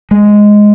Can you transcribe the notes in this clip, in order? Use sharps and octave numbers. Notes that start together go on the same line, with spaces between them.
G#3